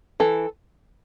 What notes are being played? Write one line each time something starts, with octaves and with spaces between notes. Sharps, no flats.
E3 A4